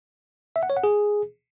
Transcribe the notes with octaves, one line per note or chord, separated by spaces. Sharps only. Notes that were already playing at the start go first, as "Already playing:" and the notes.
E5
F#5
C#5
F#5
G#4